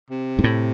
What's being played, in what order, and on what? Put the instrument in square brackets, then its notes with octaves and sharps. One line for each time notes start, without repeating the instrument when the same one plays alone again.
[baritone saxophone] C3
[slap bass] G#2
A2